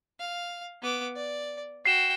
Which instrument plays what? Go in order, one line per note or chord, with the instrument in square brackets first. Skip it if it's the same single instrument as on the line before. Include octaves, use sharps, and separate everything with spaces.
[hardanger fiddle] F5
B3 D6
D5
[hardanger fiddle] F#4 G5 [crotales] C7 E7